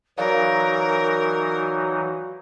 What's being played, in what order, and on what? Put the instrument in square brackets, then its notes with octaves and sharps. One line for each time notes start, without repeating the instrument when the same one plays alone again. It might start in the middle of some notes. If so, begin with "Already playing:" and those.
[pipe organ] E3 F#3 D#4 [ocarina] F#4 [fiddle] A#4 [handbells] C#5 D5 F5